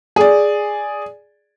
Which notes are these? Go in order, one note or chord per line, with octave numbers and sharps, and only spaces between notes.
G#4 D5